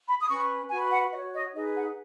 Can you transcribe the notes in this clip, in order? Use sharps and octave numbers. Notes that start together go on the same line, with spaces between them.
B5
D#6
C#4 B4 C#6
F#4 B4 G#5
F#5
F#4 C#5 D#5
D#5
D#4 G#4 B4 D#5
F#5